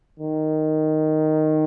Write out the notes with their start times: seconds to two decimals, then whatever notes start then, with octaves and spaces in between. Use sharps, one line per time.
0.19 D#3